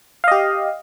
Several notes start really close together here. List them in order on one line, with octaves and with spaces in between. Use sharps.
F5 D#5 G4